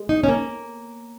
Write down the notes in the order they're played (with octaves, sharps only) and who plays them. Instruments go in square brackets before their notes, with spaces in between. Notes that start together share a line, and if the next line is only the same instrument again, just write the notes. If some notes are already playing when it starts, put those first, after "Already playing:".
Already playing: [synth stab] G#3
[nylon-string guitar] D#4
C#4
A#3